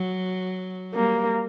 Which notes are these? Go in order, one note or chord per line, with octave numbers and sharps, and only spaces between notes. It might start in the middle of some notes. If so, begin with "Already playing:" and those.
Already playing: F#3
G3 A#3